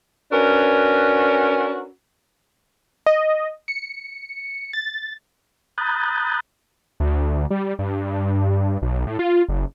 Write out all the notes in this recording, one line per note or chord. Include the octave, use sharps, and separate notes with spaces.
C#4 D4 F#4 A#4 B4
D#5
C#7
A6
A#5 B5 D#6 F#6 G6 A6
D2
G3
G2
B1
A2
F4
F#1